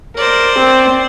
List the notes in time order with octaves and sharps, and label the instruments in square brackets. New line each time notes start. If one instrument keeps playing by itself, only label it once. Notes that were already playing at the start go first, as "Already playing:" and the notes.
[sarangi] A#4 [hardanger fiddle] C5 D5
[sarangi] C4